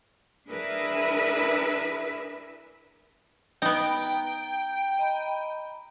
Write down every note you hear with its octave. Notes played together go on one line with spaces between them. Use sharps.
D4 E4 G#4 A#4 B4 E5
B3 D#4 G5
A#5
D#5 A#5 B5